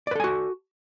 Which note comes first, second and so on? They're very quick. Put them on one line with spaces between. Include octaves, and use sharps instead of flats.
D5 B4 A4 G#5 F#4